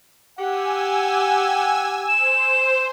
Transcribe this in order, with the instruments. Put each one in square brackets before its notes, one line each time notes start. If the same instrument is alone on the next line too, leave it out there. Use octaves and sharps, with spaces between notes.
[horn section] G4 F#5 [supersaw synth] G#5 E6
[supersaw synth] C5 [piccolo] E7